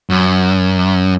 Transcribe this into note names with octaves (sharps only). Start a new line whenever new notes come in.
F#2